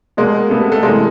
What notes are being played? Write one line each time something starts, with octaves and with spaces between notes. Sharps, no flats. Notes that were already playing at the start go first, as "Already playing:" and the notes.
B2 G#3 A#3
A3 B3
A3
C3 E3 G#3 A#3